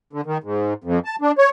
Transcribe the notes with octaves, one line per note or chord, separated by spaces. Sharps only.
D3
D#3
G#2
F2
A5
D4
C#5